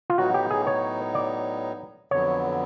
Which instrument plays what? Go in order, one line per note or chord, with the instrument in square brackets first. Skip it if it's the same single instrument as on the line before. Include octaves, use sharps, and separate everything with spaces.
[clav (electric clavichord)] F4
[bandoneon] A2 F#3 B3 D#4 [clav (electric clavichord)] F#4
[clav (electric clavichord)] G4
G#4
C#5
D5
[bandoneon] F2 D3 F#3 B3 [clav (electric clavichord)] C#5